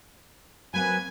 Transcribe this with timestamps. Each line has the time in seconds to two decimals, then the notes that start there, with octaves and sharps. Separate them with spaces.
0.74 F#3 A#3 C4 B4 G#5